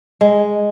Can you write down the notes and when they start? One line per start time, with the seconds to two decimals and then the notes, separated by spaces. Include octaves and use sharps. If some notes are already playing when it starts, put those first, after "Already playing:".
0.21 G#3